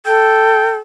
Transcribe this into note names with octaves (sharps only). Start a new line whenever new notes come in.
A4 G5